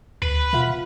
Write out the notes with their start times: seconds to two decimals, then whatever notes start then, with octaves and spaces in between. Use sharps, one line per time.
0.22 D2 B4
0.53 B2 F4 E5 F#5